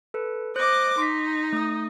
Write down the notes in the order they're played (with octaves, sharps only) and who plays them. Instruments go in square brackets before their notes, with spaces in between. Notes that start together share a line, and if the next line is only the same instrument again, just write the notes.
[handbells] A4 B4
[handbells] C5 F#6 [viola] D#5 D6
[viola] D#4 [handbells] C6 B6
[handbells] A3 D#6